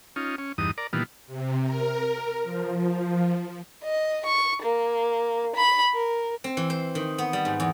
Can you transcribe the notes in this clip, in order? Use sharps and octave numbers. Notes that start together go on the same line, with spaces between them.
C#4 D#4 F4
C#4
E2 G2 D#4 D#6
A#4 D5
A#2 D#3 E3 G3 B3 F4
C3
A#4
F3
D#5
C#6
A#3
B5
A#4
C4
E3
C5
D#3
B3
G3
G#2
E2